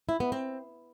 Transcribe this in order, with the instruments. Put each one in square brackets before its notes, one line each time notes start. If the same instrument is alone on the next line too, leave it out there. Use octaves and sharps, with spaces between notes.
[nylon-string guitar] E4
B3
C4